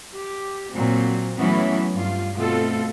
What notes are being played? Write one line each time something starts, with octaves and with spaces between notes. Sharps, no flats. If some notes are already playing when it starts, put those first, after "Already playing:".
G4
A#2 F#3 C4
E3 F#3 A3 B3 C#4 E4
G2 F4
B2 A3 C4 F4 A4